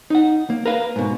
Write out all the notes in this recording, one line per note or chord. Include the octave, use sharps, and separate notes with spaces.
D#4 F#5
A#3
A#4 B4 F5
G#2 B2